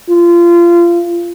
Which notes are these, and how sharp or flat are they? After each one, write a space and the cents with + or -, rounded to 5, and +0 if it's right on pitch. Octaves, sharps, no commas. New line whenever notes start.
F4 -25